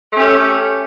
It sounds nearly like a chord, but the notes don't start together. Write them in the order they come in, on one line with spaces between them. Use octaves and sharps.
A3 C#4 G4